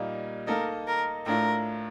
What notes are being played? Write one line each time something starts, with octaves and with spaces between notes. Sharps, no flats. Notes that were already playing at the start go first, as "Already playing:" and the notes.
Already playing: A#2 G3 A#3 D#4
A#3 D#4 A4 A#4 D#5
A#4
A2 A3 D4 F4 A#4